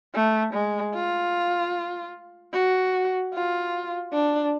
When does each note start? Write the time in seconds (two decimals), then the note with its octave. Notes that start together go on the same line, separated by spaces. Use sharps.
0.15 A3
0.54 G#3
0.94 F4
2.53 F#4
3.34 F4
4.13 D4